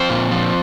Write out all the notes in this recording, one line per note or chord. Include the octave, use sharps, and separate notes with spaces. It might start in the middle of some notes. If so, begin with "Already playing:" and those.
Already playing: F3 C4 C5
A#2
F3